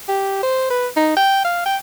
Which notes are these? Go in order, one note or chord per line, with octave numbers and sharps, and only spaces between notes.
G4
C5
B4
D#4
G5
F5
G5